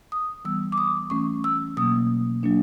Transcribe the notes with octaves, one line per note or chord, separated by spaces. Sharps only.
D#6
E3 G3 B3 E6
D6
D#6
E3 A3 C#4 C#6
E6
B2 F#3 A#3 D#6
F#3 A#3 D4